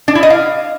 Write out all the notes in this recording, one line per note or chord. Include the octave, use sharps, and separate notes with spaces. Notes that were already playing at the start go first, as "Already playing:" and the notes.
D4
E4
D#5
F5